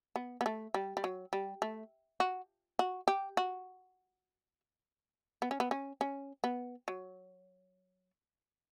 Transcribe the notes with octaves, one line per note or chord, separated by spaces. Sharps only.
B3
B3
A3
G3
G3
F#3
G3
A3
F#4
F#4
G4
F#4
B3
C#4
B3
C#4
C#4
B3
F#3